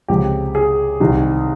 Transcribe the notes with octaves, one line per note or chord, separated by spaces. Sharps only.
C#2 C3 F3 G#3 G4
G#4
C2 C3 D#3 G3